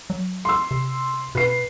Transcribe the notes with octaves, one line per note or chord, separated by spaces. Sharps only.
F#3
C6 E6
C3
B2 B4 C7